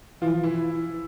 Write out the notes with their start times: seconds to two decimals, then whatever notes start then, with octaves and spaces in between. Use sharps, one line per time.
0.21 E3 F3 F4
0.43 E3 E4